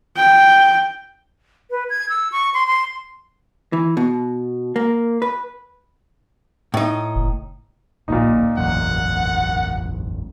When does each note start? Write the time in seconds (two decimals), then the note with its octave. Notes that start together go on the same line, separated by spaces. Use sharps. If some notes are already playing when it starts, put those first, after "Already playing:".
0.17 G5
1.71 B4
1.90 G#6
2.09 E6
2.32 C#6
2.54 C6
2.67 C6
3.73 E3
3.97 B2
4.76 A#3
5.22 B4
6.74 A2 D#4
7.15 F#1
8.08 D1 A#1 A#2 A#3 D#4
8.58 E1 A1 F#2 F#5